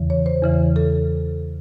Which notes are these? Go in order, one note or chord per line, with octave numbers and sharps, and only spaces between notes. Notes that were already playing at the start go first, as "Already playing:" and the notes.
Already playing: E2 C#3 E3
C#5
C5
E2 C#3 E3
A4